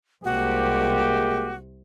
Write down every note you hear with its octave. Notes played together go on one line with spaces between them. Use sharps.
C2 C3 G#3 A#3 F#4 G4